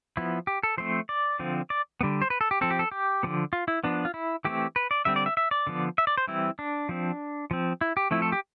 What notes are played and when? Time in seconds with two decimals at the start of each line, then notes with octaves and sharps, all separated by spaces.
0.17 F3 B3 E4
0.47 G4
0.63 A4
0.78 F3 A3 C4 C5
1.09 D5
1.39 D3 F3 C4
1.70 D5
2.01 D3 G3 B3
2.22 C5
2.30 B4
2.41 A4
2.51 G4
2.61 F3 C4 A4
2.71 G4
2.79 A4
2.92 G4
3.23 D3 F3 B3
3.53 F4
3.68 E4
3.84 F3 B3 D4
4.05 F4
4.14 E4
4.45 E3 A3 C4 G4
4.76 B4
4.91 D5
5.05 D3 G3 C4 E5
5.16 D5
5.26 E5
5.37 E5
5.51 D5
5.67 D3 F3 B3
5.98 E5
6.07 D5
6.18 C5
6.28 E3 G3 C4 E4
6.59 D4
6.89 F3 C4
7.51 F3 C4
7.81 E4
7.97 G4
8.11 F3 A3 C4 E4
8.22 A4
8.32 G4